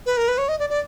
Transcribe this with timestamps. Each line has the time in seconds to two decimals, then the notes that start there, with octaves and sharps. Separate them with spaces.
0.06 B4
0.17 A#4
0.28 B4
0.38 C#5
0.49 D#5
0.59 D5
0.70 D5